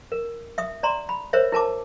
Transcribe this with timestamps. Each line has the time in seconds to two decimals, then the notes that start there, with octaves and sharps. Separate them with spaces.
0.12 A#4
0.58 E5 D#6
0.83 D5 A#5 C6
1.09 B5
1.33 A#4 C5 C#5 E5
1.52 E4 A#4 A5 D6